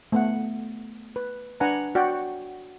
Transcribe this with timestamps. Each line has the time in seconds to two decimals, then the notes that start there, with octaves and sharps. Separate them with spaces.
0.12 A3 B3 F#5
1.16 B4
1.60 D4 B4 F#5 G#5 A#5
1.95 F#4 D5 F#5 G5